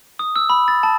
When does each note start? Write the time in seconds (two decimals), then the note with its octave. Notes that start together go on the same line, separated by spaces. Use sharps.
0.19 D#6
0.36 E6
0.50 B5
0.68 A6
0.83 A5